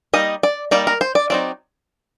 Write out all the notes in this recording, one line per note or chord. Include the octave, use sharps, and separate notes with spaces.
G3 A#3 D#4 D#5
D5
G3 A#3 D#4 D5
A#4
C5
D5
F#3 C4 D#4 D5